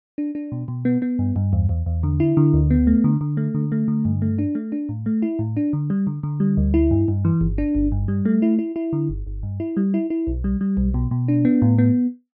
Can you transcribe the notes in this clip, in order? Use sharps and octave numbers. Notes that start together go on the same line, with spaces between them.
D4
D4
B2
B2
B3
B3
G2
G2
E2
E2
E2
D3
E4
D3
D2
B3
A3
D3
D3
A3
D3
A3
D3
G2
A3
D4
A3
D4
A2
A3
E4
A2
D4
D3
G3
D3
D3
G3
D2
E4
G2
G2
E3
G1
D4
G1
G2
G3
A3
E4
E4
E4
D3
G1
G1
G2
E4
G3
E4
E4
B1
G3
G3
B1
B2
B2
D4
B3
A2
B3